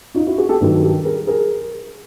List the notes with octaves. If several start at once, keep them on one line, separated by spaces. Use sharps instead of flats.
D#4 F4
E4 F#4
F#4 G#4
G4 A4
G2 D#3 F#3
G4 A4
G#4 A#4
G#4 A#4